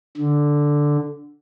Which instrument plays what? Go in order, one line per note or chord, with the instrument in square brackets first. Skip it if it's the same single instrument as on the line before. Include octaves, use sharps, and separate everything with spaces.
[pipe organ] D3